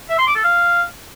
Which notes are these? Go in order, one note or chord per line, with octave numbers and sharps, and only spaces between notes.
E5
C6
D6
A4
F5